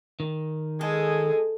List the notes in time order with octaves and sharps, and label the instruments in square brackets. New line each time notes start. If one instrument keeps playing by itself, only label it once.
[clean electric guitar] D#3
[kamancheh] G#3 G#4 [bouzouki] A4